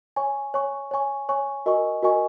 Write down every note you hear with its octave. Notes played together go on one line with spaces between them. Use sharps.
C#5 G#5 C#6
C#5 G#5 C#6
C#5 G#5 C#6
C#5 G#5 C#6
F#4 A#4 D#5 G#5 C#6
F#4 A#4 D#5 G#5 C#6